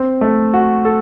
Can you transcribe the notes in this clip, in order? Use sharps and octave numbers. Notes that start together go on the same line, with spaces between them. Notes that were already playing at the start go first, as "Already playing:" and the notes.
Already playing: C4
A3
F#4
A4